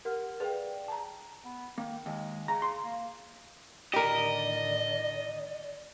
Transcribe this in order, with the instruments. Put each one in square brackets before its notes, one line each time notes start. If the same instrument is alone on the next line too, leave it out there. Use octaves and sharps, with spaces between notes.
[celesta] G4 F#5 F6 [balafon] A#4
[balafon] G#4 B4 [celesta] D5 F5 G5
[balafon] A5 A#5
[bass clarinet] B3
[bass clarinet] D#3 [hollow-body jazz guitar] A#3
[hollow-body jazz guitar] D#2 [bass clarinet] G#3
[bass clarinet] C#3 [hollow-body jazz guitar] A#5
[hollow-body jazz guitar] C6
[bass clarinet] A#3
[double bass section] A2 D3 D#3 [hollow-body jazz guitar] G4 A#4 [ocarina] D5 [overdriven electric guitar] D#5